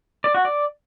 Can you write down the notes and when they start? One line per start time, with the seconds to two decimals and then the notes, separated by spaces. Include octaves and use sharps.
0.24 D5
0.34 F#4
0.45 D5